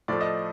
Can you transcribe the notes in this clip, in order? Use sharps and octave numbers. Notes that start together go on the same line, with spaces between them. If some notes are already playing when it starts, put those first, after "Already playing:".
A2 F3 A3 D5
D#5